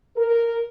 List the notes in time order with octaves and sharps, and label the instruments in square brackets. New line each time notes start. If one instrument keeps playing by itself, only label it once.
[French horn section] A#4